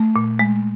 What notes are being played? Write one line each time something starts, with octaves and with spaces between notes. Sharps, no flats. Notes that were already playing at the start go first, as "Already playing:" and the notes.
Already playing: A3
A#2
G#3